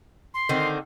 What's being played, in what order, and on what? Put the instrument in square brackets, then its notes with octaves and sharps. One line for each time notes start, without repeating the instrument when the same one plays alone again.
[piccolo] C6
[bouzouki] D3 D#3 C4